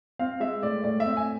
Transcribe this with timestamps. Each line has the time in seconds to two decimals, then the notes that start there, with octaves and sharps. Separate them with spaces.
0.19 C4 F5
0.40 G#3 E5
0.62 A2 D5
0.84 A2 D5
1.00 C4 E5
1.17 G#5